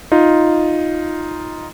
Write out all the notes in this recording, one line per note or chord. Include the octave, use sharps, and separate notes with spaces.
D#4 F4